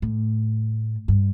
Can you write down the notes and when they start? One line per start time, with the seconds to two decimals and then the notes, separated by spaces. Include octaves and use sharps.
0.02 A2
1.08 G2